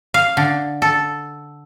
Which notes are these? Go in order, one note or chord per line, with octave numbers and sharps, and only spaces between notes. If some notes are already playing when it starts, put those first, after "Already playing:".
F5
D3
A4